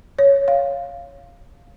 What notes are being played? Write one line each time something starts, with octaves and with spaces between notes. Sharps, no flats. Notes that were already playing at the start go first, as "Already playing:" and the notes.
C#5
F5